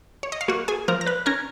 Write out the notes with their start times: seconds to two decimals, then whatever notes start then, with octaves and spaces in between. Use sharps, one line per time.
0.23 C#5
0.32 D#5
0.41 F5
0.48 A#3 F#4 F#5
0.68 G#4 G#5
0.88 F3 A#4 A#5
1.01 A#5
1.06 B4 B5
1.26 C#4 A#4 A#5